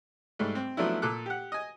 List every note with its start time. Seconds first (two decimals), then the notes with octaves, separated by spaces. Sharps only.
0.39 G#2 G3 A3
0.55 C4
0.77 F3 F#3 A3 B3 D4 E4
1.02 A#2 A4 D6 F#6
1.26 G4 F#5
1.52 D#5 G#5